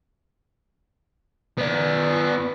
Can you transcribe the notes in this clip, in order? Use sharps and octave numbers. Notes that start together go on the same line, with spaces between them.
B3 D5